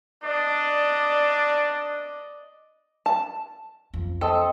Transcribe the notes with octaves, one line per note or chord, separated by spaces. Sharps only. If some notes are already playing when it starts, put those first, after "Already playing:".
D4 D5 D#5
A5
F2
C4 A4 D#5 A5